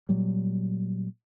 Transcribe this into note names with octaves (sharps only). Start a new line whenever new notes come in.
A#2 F#3 G3